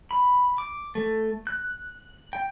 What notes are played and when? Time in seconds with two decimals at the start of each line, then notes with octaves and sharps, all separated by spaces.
0.11 B5
0.58 D6
0.95 A3
1.47 F#6
2.33 G5